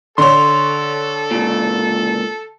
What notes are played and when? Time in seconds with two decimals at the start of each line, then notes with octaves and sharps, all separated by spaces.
0.18 D3 A4 C#5 C6
1.31 C#2 A#2